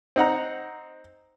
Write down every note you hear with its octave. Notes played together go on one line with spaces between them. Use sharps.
C4 D#4 F#5 A#5